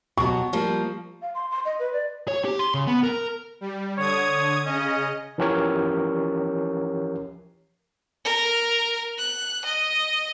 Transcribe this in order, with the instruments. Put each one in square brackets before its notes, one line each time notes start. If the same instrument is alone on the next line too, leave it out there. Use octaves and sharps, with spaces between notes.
[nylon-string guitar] B2 F#3 [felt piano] C#6
[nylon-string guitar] F3 G3 A#3
[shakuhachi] F5
C6
C6
D#5
B4
D5
[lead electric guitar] C#5
G4
C6
C#3
B3
A#4
[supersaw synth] G3
[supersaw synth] D3 D#6 G#6 [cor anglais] C#5
[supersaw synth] C#3 D#5 [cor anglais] C#4
[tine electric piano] E3 F3 C#4 G4 A#4 C#5
[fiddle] A#4
F#6
D#5